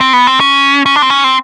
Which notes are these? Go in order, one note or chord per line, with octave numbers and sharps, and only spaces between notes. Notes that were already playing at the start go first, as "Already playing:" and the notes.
C4
B3
C4
C#4
C#4
D4
C4
C#4
C4